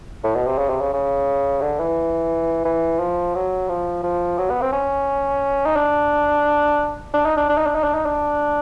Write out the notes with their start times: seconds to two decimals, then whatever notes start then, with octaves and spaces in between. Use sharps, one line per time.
0.24 A2
0.35 B2
0.47 C3
0.58 C#3
0.70 C3
0.81 C#3
0.93 C#3
1.62 D3
1.80 E3
2.65 E3
2.99 F3
3.35 F#3
3.69 F3
4.04 F3
4.38 F#3
4.50 B3
4.62 C4
4.73 C#4
5.66 D#4
5.76 D4
7.14 D4
7.26 D#4
7.37 D4
7.49 D4
7.58 D#4
7.66 D4
7.75 D#4
7.84 D4
7.95 D#4
8.06 D4